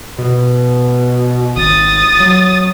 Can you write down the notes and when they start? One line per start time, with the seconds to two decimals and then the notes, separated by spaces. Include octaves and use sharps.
0.19 B2
1.56 G#1 D#6 A6
2.20 F#3